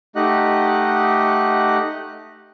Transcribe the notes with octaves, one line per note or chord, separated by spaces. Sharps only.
A3 D#4 G4 D#5 F#5 F#6